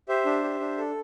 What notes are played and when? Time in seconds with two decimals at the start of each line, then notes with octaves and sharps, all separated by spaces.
0.09 G4 C5 E5
0.25 D4
0.43 G4
0.60 D4
0.78 A4